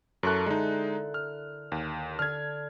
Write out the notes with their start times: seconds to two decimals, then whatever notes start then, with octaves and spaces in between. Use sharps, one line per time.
0.23 F#2 E4 A4 A#4 C#6 F#6
0.46 D3 G#3 D#4
1.14 F6
1.72 D#2
2.19 D3 F6 G#6